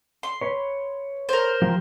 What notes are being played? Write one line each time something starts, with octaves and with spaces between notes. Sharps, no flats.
C6
B4 C#5
A#4 C5
F3 G4